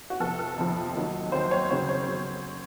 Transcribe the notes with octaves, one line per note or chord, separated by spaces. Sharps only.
F#4
F2 C3 F3 A4
A4
F2 C3 F3
D#2 D#3 F#3
D#2 D#3 F#3 C5
C#5
F#1 F2 C#3 F#3 C5
C#5
C#3 F#3